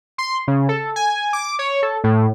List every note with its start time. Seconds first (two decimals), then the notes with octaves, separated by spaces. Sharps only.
0.18 C6
0.47 C#3
0.69 A4
0.96 G#5
1.33 D6
1.59 C#5
1.82 A4
2.04 A2